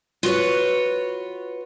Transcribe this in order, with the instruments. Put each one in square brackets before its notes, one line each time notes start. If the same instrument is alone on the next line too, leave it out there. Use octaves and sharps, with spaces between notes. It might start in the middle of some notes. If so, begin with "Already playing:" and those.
[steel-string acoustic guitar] F4 F#4 B4 C#5